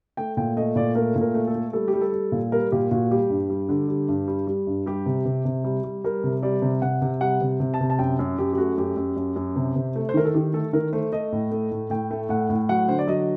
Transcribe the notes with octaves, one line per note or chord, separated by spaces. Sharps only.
A3 G5
A#2 G5
A3 D#5
A#2 D5
A3 A#4
A#2
A#4
A3
A4
A3
G3 A4
G4
G3
A4
G3
A#2
G3 A#4
A#2 G4
A#2 F#4
G3 G4
G2
G3
D3
G3
G2
G3
G3
G2
G3 G4
C3
C3
C3
G3
G3
G3 A#4
C3
G3 D5
C3
C3 F#5
C3
G3 F#5
C3
C3
A5
C3
A5
F#2 G5
F#2
F#2 G4
G4
A3 F#4
F#2 G4
F#2
F#2
F#2
C3
C3
A3
C5
D#3 A#4
A4
D#3 G4
A3 A4
D#3 A#4
A3 C5
A3 D#5
A2
A3
A2
A2 G5
A3
A2 F#5
A2
F#3 F#5
D3 C5
D5
F#3 D#5